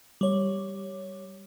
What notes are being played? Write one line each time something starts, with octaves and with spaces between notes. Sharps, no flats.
G3 C#5